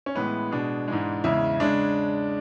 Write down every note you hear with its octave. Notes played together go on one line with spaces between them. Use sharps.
C#4
A2 E3 G#3 B3
B2 G#3 D4
G#2 E3 G#3
E2 C#3 G#3 E4
C#3 G#3 D4